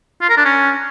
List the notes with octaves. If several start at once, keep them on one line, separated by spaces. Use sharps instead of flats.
F4
A#4
D4
C#4